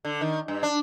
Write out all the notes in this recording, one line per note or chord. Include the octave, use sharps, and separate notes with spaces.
D3
D#3
G2
D4